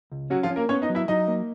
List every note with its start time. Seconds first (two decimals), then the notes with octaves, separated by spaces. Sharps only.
0.12 C#2
0.30 F#3 C#4 F#4
0.43 F3 F4
0.50 C#4
0.56 A#3 A#4
0.69 B3 C#4 C#5
0.82 D#4 D#5
0.89 F#3
0.95 E4 E5
1.08 F#3 D#4 D#5
1.28 A#3